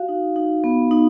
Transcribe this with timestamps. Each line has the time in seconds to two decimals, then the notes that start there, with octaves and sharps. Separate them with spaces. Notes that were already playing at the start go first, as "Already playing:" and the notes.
Already playing: F#4 F5
0.09 D#4
0.36 D#4
0.64 B3
0.91 D#4